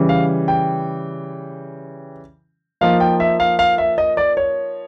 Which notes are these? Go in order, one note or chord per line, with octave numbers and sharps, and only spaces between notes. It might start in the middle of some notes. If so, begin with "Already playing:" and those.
Already playing: C#3 E3 G3
F5
G5
F3 A#3 D#4 F5
G5
E5
F5
F5
E5
D#5
D5
C#5